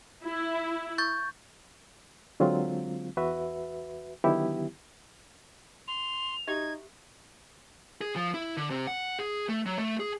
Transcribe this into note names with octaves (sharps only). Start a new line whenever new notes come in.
E4
C#6 G6 A6
D3 F#3 G#3 C4 F4
E2 F#4 B4 E5
D3 D#3 F#3 B3 E4 G4
C6 F7
D#4 F#4 G4 E5 G#6
G#4
F3
E4
D3
C3
F#5
G#4
A3
F#3
A3
G#4